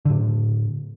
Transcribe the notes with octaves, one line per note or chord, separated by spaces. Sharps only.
A2 D3